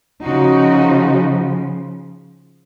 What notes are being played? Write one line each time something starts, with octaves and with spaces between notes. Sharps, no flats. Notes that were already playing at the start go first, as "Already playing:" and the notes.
C#3 F3 D#4 F#4